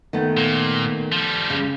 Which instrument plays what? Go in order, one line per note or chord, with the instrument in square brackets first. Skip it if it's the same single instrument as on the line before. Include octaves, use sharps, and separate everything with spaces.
[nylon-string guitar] D#3 A3 B3
[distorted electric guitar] A#2
F3 G3
[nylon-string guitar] C#3